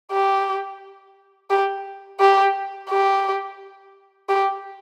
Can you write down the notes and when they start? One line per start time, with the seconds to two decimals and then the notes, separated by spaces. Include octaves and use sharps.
0.11 G4
1.50 G4
2.20 G4
2.90 G4
4.29 G4